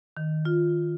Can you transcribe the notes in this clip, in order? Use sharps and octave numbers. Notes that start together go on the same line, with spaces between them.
D#3
F4